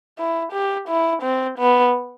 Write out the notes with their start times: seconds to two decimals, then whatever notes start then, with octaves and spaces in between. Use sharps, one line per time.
0.18 E4
0.53 G4
0.89 E4
1.23 C4
1.59 B3